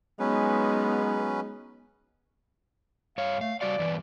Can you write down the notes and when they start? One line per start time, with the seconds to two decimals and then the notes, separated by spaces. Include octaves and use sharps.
0.20 F#3 G#3 B3 C#4 D#4 B4
3.18 G2 C#5 F5
3.41 A3 F5
3.61 G3 F#4 D5 F5
3.79 G2 E3 B3